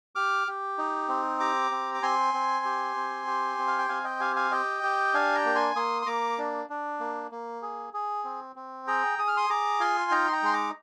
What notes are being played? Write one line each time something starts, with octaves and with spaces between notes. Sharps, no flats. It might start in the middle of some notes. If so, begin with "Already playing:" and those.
G4 D6 F6
G4
D#4
C4
G4 A#5 D6
C4
D6
C4 G#5 C6
C4
G4
C4
G4
C4
F5
G5
C4 F5 G#5
D#5 G5
G4 F5 G#5
F5 G#5
G4 D#5 G5
G4
D4 F5 G#5
G5 A#5
A#3
G#5 C6
A#3 C6 D#6
C6
A#3 A#5 D6
D4
D4
A#3
A#3
G#4
G#4
C4
C4
G#4 G5 A#5
G#4 D#6
F6
C6 D#6
G#4 A#5 D6
F4 G#5 C6
D#4 G5 A#5
C6
G5 A#5
G#3 C6
A#5 D6